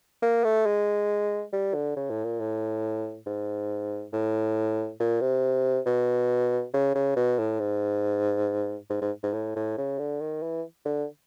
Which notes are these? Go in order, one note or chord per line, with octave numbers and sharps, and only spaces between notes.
A#3
A3
G#3
G3
D3
C#3
A2
A#2
A2
G#2
A2
A#2
C3
B2
C#3
C#3
B2
A2
G#2
G#2
G#2
G#2
A2
A2
C#3
D3
D#3
E3
D3